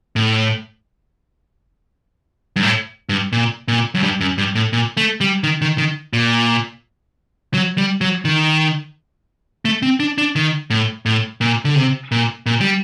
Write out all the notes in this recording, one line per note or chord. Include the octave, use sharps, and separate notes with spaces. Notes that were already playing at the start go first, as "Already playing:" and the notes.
A2
G2
A2
G2
A#2
A#2
F#2
G2
F#2
G2
A2
A#2
A3
G3
D#3
D#3
D#3
A#2
F#3
G3
F#3
D#3
A3
C4
D4
D4
D#3
A2
A2
A#2
D3
C3
A#2
A#2
G3